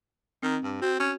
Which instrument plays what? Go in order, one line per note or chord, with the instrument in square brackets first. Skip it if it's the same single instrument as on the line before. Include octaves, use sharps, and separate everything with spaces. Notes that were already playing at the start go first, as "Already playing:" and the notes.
[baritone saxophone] D#3 [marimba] C4
[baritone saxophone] G2
[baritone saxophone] C4 [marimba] F#4
[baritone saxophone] C#4